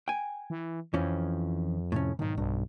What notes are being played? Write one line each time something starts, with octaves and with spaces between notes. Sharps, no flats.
G5 G#5
E3
F2 E3 F3 C#4
A2 C3 C#4
B1 G#2 D#3
B1 G2